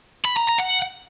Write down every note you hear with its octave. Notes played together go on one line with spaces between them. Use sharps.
B5
A#5
A#5
F#5